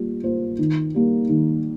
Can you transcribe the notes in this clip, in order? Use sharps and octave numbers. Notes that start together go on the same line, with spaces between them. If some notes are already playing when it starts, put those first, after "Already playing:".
Already playing: G3 A#3 F4
A#3 F4 C5
D#3
G3 A#3
D#3